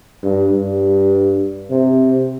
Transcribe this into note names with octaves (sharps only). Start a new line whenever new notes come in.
G2
G2
C3